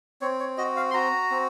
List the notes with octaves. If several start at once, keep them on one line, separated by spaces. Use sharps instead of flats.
C4 C#5
C#5
F#4 D#5
F5
C6
F#4 A#5
C4